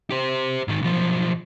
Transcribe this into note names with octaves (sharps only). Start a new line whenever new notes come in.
G4 C5
G#2 D#3
B1 F3